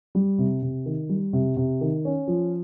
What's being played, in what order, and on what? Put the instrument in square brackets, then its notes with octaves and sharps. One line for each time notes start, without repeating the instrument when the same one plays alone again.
[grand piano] G3
C3
C3
D#3
G3
C3
C3
D#3
C#4
F3